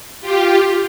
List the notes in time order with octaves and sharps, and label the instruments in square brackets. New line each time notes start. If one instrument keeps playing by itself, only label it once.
[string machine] F4 G4